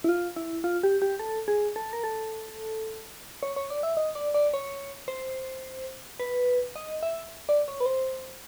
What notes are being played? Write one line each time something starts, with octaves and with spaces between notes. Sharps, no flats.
E4
F4
E4
F4
G4
G4
A4
G#4
A4
A#4
A4
C#5
C#5
D5
E5
D#5
D5
D5
C#5
C5
B4
D#5
E5
D5
C#5
B4
C5